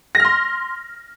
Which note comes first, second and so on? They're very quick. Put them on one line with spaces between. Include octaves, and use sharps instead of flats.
A#6 F6 C6